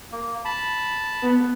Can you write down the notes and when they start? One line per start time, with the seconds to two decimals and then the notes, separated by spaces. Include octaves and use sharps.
0.12 A#3
0.45 A5 B5
1.23 B3